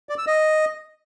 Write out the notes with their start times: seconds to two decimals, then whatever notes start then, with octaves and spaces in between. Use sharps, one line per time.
0.09 D5
0.18 E6
0.27 D#5